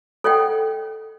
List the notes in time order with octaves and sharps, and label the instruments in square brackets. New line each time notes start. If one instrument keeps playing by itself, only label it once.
[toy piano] A4 C#5 D#5 F#5 G5